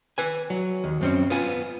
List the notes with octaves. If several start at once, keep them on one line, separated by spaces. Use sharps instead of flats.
B4 G#5
F#3
D#2
F#2 C4 C#4
B3 F4 G#5